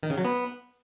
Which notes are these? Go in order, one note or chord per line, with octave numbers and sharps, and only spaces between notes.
D#3
C#3
F#3
B3